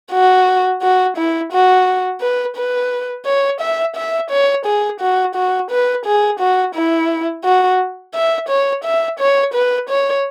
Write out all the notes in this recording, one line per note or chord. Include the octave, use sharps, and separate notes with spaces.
F#4
F#4
E4
F#4
B4
B4
C#5
E5
E5
C#5
G#4
F#4
F#4
B4
G#4
F#4
E4
F#4
E5
C#5
E5
C#5
B4
C#5